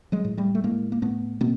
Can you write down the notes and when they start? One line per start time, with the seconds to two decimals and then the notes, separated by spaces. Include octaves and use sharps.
0.12 F#3 G#3
0.24 A2
0.37 G3 A3
0.55 A3
0.64 A2 G#3 A#3
0.92 A#3
1.02 A2 A3 B3
1.41 B2 A#3 C4